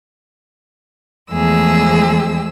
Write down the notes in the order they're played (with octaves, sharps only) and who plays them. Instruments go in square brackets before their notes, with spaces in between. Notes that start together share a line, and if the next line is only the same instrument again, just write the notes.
[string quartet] E2 F3 G#3 A3 G#4 E6